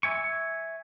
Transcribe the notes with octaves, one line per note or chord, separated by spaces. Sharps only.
E5 G#5 C#6